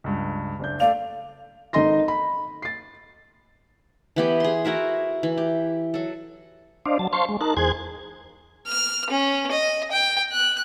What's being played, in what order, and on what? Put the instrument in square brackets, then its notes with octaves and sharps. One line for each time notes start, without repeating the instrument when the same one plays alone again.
[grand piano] C#2 G2
F#1 D4 G6
[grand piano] A3 D5 F7 [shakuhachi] F5
[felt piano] G#1 D#4 A4 D#5 C6 A#6
B5
A6 C7
[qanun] E3 B3 G4
G#4 C6
E4 F#4 A#4 E5
E3
G4
F#3 A4
[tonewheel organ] D4 C5 D5 D#5 F5
F#3 A5
C5 F5 A5 C6 C#6
G#3
D#4 A#4 A5 F#6
E2 G#4 C5 G#5 F#6 G#6
[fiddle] F6
C#4
D#5
G5
F#6